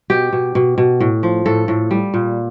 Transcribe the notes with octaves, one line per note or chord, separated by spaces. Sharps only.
B2 G4
B2
B2
B2
A2
F3
A2 A4
A2
G3
A#2